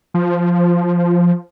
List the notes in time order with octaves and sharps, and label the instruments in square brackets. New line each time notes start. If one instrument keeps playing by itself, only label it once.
[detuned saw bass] F3